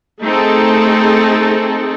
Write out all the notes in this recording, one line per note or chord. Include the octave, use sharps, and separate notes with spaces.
A3 C4 D#4 G#4 A4